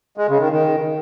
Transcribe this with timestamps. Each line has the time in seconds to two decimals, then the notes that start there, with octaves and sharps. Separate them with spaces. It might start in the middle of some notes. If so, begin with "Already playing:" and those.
0.18 G#3
0.29 C#3
0.40 D#3
0.51 D#3